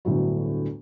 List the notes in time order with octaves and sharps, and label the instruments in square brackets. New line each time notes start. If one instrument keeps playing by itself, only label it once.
[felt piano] G1 D2 A2 D3 F#3